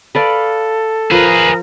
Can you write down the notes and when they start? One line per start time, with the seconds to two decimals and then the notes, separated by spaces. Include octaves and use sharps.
0.15 A4 B4 D5 F5
1.11 F3 G#4 A#4 B4